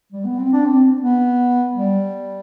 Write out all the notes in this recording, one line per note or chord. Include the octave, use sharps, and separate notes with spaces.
G3
B3
C4
D4
C4
B3
G3